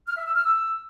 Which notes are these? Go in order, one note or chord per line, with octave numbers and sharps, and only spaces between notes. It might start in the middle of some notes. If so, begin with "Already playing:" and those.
F6
E5
E6
F6
E6